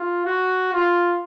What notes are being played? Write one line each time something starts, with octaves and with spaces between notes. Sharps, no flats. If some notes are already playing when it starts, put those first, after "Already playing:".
Already playing: F4
F#4
F4